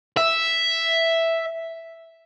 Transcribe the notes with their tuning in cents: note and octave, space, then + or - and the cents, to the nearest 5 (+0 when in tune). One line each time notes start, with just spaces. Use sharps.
E5 +0